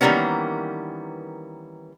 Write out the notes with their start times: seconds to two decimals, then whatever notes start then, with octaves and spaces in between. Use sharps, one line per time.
0.01 D#3 E3 G3 A#3 B3 C#4